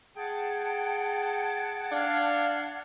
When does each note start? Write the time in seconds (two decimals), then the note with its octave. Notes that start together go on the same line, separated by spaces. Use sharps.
0.16 G#4 F#5 G5 A5 G#6
1.92 D4 F5